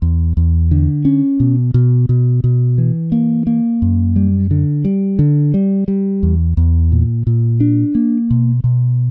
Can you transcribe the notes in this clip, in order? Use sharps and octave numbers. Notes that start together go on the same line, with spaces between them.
E2
E2
D3
C#4
B2
B2
B2
B2
E3
A#3
A#3
F#2
G3
D3
G3
D3
G3
G3
E2
E2
A#2
A#2
D4
A#3
B2
B2